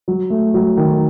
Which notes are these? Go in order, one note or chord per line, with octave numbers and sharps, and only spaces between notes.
F#3
A3
F#3
D#3